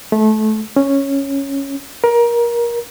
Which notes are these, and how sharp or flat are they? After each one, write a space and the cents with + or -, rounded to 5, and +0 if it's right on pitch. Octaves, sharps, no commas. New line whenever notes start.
A3 -25
C#4 -5
A#4 +20